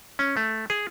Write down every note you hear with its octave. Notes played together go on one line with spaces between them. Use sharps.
C#4
A3
G#4